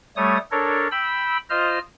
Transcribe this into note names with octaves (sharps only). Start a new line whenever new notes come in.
G3 A3 C#5 D#6
D4 A4 A#4 C#5
G5 B5 E6
F4 C5 D#5 F6